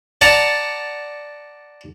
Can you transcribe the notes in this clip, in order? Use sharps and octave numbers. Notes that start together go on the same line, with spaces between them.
D5 F#5 A5 A#5